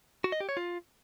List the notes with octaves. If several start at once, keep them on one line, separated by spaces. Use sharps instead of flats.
F#4
D#5
G4
C#5
F4